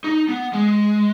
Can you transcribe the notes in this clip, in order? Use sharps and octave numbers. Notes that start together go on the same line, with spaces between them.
D#4
B3
G#3